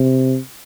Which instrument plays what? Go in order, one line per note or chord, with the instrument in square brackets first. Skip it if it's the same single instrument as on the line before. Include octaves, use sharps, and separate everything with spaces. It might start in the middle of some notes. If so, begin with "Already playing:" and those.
Already playing: [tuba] C3